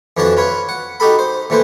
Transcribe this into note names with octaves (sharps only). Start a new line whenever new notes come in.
F2 E3 F3 D4 F#4 A5
F4 B4 C#5
F#5
D#4 F#4 G4 A4 B5
C5
A#2 E3 A3 B4 C5